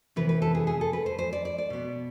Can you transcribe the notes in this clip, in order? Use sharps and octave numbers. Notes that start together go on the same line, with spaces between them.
C3 E3 B3 B4
B4
A4
G#4
G#4
A4
B4
C5
C5
D5
D5
D5
B2 B3